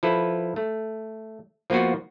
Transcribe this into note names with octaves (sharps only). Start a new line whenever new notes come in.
F3 E4 A4 B4
A3
F3 A#3 B3 F4 F#4